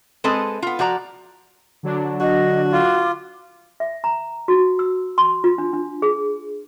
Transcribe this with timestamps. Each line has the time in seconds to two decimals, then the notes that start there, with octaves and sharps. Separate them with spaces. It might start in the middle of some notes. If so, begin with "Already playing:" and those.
0.24 G#3 C4 A4 B4 D#5
0.62 B3 F4
0.79 F3 F#4 D5 A#5
1.83 D3 F#3 D4
2.20 F#4 D#5
2.72 F4 D6
3.80 E5
4.04 A#5
4.48 F#4
4.79 E6
5.18 C6
5.44 F4
5.58 D4
5.73 D4
6.02 G#4